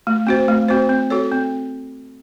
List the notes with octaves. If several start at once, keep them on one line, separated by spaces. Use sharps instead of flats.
A3
C4 F#4 C5
A3
C4 F#4 C5
C4
F#4 A4 C#5
C4